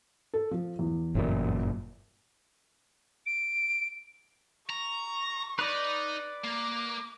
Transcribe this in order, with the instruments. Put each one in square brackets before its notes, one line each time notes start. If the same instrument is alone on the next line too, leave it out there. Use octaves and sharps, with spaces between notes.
[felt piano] A4
F3
E2
[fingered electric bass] G1 F#2 A#2
[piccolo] D7
[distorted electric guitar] A#5 [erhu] C#6
[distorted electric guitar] D#4 [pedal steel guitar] B4 D5
[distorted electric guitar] A#3 [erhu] D6